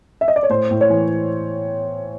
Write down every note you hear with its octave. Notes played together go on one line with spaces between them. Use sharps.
E5
D#5
D5
C#5
A2 C5
A2
C#5
E3